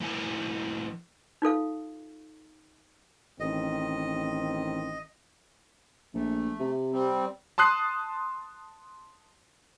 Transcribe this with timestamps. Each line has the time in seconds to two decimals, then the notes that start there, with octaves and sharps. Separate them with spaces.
0.01 A2 F3 E4 A#4 C5 G#5
1.42 D#4 F4 A4 F5
3.40 A1 D#3 C4 D#5
6.15 A#1 A3
6.60 C3
6.92 G3 C4
7.58 A5 C6 D#6 F#6 C7